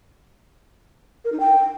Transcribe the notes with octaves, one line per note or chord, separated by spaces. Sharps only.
A#4
D#4
G5